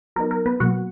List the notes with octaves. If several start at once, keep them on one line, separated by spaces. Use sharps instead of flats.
F#3 B3 D#4 A#4
A#4
B3 B4
B2 F#3 A#3 F#4 F#5